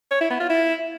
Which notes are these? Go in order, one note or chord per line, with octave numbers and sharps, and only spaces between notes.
C#5
E4
B3
F4
E4